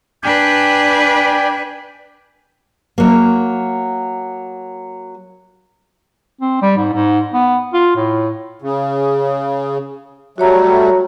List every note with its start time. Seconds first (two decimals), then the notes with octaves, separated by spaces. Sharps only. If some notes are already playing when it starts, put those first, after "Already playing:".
0.23 D4 B4 D5 G5 G#5
2.98 F#3 A#3
6.41 C4
6.62 G3
6.77 G#2
6.93 G#2
7.34 B3
7.73 F4
7.96 A2
8.62 C#3
10.38 F#3 G3 A3 F#4 C#5 A#5